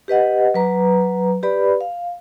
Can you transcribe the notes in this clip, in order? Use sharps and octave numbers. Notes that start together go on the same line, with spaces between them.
G4 B4 D#5 F#5
F#3 B4 A#5
G4 B4 D5 B5
F5